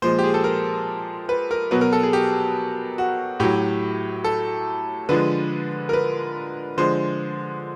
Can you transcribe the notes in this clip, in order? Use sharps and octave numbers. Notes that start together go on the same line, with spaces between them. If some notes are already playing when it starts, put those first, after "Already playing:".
A#2 F3 G#3 C5
G4
G#4
A4
A#4
B4
A#4
B2 F#3 B4
A#4
A4
G#4
G4
F#4
A2 F#3 G4
A4
D3 F3 G#3 B4
A#4
B4
D3 F3 G#3 C5